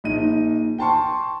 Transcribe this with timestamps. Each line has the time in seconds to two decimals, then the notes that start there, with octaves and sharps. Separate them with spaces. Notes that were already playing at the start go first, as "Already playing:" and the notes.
0.04 A#1 D#4 D#7
0.78 G5 A5 C6 C#6